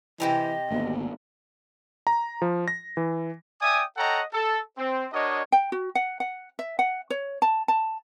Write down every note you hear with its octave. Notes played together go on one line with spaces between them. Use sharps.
C3 E3 G4 D#5 A#5
G#1 D2 A#3 B3
A#5
F3
A#6
E3
D5 E5 G5 G#5 D#6
A4 C#5 D#5 F#5 G5 A#5
A4
C4
D4 F#4 A#4 C#5 D#5
G5
F#4
F#5
F#5
E5
F#5
C#5
A5
A5